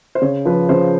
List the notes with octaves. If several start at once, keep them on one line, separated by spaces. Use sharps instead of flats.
C5
C#3 C#5
F3 B4
C#3 C5